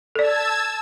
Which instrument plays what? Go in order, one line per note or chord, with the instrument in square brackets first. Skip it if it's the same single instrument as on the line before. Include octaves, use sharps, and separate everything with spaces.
[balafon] A4 D5 [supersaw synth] A5 E6 G#6